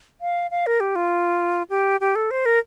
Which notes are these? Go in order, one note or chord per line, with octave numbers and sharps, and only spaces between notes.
F5
F5
A#4
G4
F4
G4
G4
A4
C5
A#4